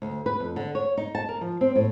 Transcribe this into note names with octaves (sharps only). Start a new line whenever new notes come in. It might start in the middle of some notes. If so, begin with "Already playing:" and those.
D2
B4
F2
D3
C#5
D#4
A5
A#4
F3
C4
A2